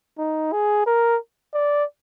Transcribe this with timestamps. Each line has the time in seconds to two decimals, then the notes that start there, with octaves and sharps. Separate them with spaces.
0.18 D#4
0.52 G#4
0.86 A#4
1.54 D5